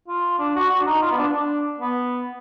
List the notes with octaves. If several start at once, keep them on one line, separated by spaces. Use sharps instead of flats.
F4
D4
F#4
F#4
D4
D#4
F4
B3
D4
D4
B3